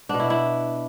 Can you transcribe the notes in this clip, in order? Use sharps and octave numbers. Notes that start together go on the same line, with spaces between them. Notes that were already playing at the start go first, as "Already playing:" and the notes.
B2 B3 D4
E4
E4